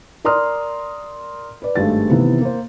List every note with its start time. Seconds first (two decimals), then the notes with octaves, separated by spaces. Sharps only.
0.25 A#4 D5 A#5 C6 D#6 F6
1.62 B4 D5
1.76 G#1 G2 G#3 A3 G4 A6
2.10 C3 D#3 E3 B3 E4
2.41 A#3 C5